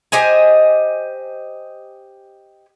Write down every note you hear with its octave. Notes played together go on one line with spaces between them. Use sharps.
G4 C5 D#5 G#5